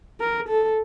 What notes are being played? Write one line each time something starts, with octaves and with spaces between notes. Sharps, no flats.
A#4
A4